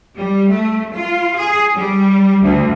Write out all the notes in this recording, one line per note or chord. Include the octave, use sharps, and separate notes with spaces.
G3
A3
F4
G#4
G3
D2